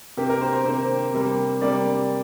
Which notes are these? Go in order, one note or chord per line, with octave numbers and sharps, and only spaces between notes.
C3 A#3 G4
A#4
C5
C5
C3 A#3 C5
C3 G3 A#3
C3 G3 A#3 D5